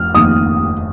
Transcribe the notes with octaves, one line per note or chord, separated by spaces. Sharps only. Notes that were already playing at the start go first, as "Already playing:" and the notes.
Already playing: F1 F6
F1 D#2 D#3 D#6